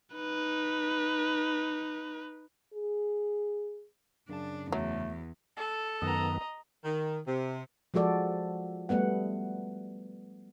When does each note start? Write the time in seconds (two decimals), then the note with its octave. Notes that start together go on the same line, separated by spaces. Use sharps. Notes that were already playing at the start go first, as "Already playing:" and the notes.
0.16 D#4 B4
2.73 G#4
4.29 F#2 C#3 D4 A5
4.72 E2 F#3 A3
5.57 A4
6.02 F#2 D#3 B3 D#5 A#5
6.84 D#3
7.27 C3
7.94 F3 G#3 F#4 A4 D5
8.89 G3 A3 B3 F#5